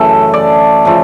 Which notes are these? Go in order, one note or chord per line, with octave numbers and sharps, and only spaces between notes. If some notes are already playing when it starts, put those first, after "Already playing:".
Already playing: F#2 C#3 E3 A3 A4
D5
C#3 F3 A3